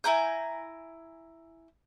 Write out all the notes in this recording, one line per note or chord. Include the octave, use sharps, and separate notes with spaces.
E4 G#5 A#5 G6